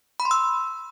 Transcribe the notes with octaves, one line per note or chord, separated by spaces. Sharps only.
B5
C6
E6